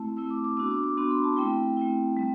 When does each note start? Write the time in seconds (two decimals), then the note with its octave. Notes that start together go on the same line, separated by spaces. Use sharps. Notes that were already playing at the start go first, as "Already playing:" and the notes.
Already playing: A3 C4 E4 A5
0.17 A3 C4 E4 E6
0.30 D6
0.44 D6
0.57 B3 D4 F#4 E6
0.71 D6
0.83 D6
0.97 B3 D4 F#4 C6
1.11 B5
1.24 A5
1.37 A3 C4 E4 G5
1.77 A3 C4 E4
2.17 G3 C4